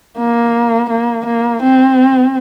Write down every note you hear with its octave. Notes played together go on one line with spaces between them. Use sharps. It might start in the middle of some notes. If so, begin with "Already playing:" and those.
A#3
A#3
A#3
C4